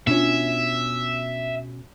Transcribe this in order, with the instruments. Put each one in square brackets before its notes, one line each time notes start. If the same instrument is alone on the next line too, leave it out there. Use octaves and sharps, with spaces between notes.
[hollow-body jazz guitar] B2 C#4 [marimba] D4 F4 [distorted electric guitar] E5